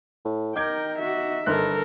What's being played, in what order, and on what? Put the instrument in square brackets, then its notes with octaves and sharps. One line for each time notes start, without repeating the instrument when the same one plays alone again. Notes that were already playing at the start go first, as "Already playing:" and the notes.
[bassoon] A2
[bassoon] D#4 [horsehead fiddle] A#4 G5 [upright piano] D6 G6 G#6
[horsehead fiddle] F#4 E5
[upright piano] G1 F#6 [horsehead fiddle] A4 A#4